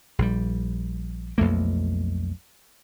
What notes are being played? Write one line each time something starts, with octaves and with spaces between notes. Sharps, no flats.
A#1 G3
B1 F2 A3 A#3